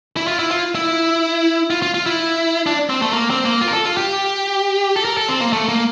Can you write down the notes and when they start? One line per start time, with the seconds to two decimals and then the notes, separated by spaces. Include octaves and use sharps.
0.16 E4
0.27 F4
0.39 E4
0.51 F4
0.75 E4
1.70 F4
1.82 F4
1.94 F4
2.06 E4
2.66 D4
2.89 C4
3.02 A3
3.13 A#3
3.30 C4
3.45 A#3
3.61 F4
3.68 A#4
3.73 A4
3.85 F4
3.97 G4
4.96 A4
5.05 A#4
5.17 A4
5.29 C4
5.41 A#3
5.53 A3
5.69 A#3